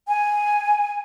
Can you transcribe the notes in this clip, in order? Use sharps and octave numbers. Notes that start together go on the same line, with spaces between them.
G#5